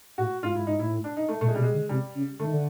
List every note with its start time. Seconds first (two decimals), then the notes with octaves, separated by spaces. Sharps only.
0.18 A2 F#4
0.43 G#2 F4
0.55 G#2 E4
0.67 G#2 D#4
0.79 A2 E4
1.04 D4
1.17 D#4
1.28 A3
1.41 A#2 A3
1.48 G#3
1.55 G3
1.57 B2
1.62 G#3
1.73 D3
1.89 C3 G3
2.15 C#3
2.39 D3 A3
2.46 D#3
2.53 D3